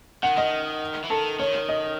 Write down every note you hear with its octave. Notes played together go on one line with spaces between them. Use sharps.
D#3 F#5
D#3 D#5
E3
D#3 A4
D#3 C#5
D#5